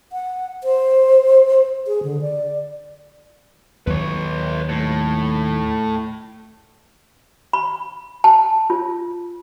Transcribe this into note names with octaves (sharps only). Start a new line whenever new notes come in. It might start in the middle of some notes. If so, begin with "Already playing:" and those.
F#5
C5
G#4
D3
D5
D#2 F#3 B4 C#5
A2
B5
A5
F4